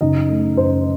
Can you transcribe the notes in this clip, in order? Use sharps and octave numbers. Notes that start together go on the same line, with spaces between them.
F#1 D#4 D#5
A3
F#2 C5